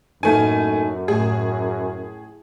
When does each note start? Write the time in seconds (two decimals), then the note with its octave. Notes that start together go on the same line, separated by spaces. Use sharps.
0.23 F#2 A2 A3 A#3 D#4 G#5
1.08 A2 G#4